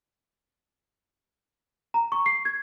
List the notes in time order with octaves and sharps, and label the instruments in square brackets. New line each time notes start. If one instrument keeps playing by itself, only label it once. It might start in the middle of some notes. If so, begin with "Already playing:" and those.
[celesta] A#5
C#6
C7
G#6